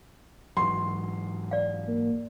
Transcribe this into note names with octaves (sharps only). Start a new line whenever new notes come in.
G#2 E3 F#3 C6 C#6
D5 F5
A#3